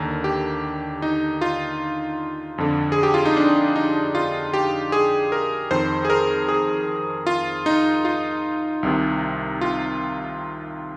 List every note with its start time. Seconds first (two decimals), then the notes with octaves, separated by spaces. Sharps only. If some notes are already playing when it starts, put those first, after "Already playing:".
Already playing: D#2 D3 A#4
0.24 G4
1.02 D#4
1.41 F4
2.58 F2 D3
2.92 G#4
3.03 G4
3.14 F4
3.25 D#4
3.36 D4
3.76 D#4
4.15 F4
4.54 G4
4.92 G#4
5.32 A#4
5.71 F2 D#3 C5
6.05 G#4
6.10 A#4
6.48 G#4
7.27 F4
7.66 D#4
8.05 F4
8.83 C2 C3 D#3
9.61 F4